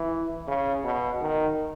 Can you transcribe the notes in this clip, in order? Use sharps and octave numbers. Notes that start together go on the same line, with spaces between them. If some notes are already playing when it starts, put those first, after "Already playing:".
Already playing: E3
C#3
B2
D#3